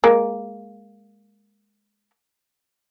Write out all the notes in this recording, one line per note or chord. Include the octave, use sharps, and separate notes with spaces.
G#3 A#3